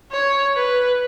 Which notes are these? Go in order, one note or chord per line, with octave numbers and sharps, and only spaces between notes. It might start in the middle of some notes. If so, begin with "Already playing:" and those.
C#5
B4